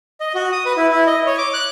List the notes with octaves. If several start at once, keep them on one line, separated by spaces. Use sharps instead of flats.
D#5
F#4
D#6
B4
E4
E4
D#5
C#5
D6
F#6